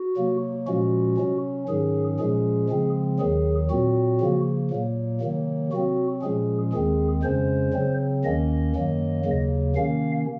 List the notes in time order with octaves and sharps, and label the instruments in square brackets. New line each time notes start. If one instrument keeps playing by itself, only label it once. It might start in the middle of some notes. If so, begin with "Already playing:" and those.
Already playing: [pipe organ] F#4
C3 F#3 A#3
A#2 F3 G#3 C#4 F#4
C3 F#3 C#4
G#2 D#3 F#3 C#4 G#4
A#2 F3 G#3 C#4 G#4
C#3 F3 G#3 C4
D#2 D#3 F#3 G#4
A#2 F#3 C4 F#4
C#3 F3 A#3
A#2 F#3 A#3
C3 D#3 F#3 A#3
C3 F#3 C4 F#4
A#2 F3 G#3 C#4 G#4
D#2 D#3 G#3 C4 G#4
F2 C#3 G#3 C#4 C5
C#3 F#3 C4
D#2 D#3 A#3 C#4 D#5
F#2 D#3 F#3 A#3
D#2 C#3 F#3 A#3
C3 D#3 A#3 C#4 F5